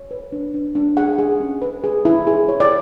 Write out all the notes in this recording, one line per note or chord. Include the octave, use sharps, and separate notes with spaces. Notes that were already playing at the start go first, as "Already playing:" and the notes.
Already playing: C#5
B4
D4
D4
D4
G#4 F#5
G#4
C#4
B4
G#4
E4
G#4
C#5
D5